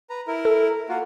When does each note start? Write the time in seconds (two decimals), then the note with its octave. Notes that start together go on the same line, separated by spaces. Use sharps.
0.10 B4 A#5
0.28 E4 A#4
0.45 A4
0.89 A#3 F4 F#4